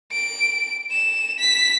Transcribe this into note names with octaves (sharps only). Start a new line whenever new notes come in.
D7
E7
B6